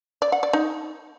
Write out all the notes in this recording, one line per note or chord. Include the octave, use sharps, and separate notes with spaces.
D5
F#5
D5
D#4